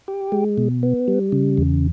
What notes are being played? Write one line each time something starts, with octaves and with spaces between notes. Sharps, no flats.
G4
G#3
B2
B3
G3
C#3
E2